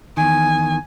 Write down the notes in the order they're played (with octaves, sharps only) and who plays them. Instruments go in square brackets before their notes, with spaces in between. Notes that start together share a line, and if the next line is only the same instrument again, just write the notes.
[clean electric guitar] E2 D#3 [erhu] G#5